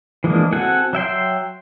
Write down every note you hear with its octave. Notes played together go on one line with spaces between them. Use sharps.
E3 F3 G#3 A#3 D4
C4 F#4 A4 F#5 G#5
F#3 E5 G5 C6